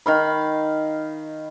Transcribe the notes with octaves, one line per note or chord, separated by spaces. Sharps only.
D#3 F5 B5